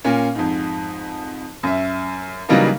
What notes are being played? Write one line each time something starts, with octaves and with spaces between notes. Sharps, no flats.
A#2 A#3 C#4
F2 G#2
F#2 E5
C#3 E3 F#3 G3 A#3 D#4